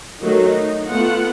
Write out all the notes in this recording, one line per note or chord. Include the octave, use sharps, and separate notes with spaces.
D#3 F#3 A3 D#4
D#4
A3 B3 F4 F#5